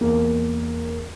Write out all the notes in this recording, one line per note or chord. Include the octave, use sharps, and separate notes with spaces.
E2 A#3